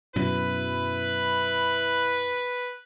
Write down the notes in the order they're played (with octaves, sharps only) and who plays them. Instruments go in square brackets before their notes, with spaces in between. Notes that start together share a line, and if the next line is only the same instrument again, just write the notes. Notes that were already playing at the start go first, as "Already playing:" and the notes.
[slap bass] F#2 B2 F#3 [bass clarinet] E4 [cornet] B4